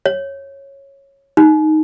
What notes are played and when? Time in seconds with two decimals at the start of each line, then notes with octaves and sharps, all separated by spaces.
0.06 C#5
1.37 D#4